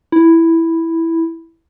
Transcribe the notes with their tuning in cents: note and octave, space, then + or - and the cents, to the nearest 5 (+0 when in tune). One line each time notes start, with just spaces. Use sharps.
E4 +0